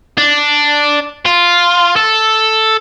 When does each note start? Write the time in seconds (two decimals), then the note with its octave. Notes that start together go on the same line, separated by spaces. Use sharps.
0.18 D4
1.25 F4
1.96 A4